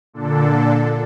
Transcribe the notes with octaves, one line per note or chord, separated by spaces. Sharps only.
A#2 D3 D4 A4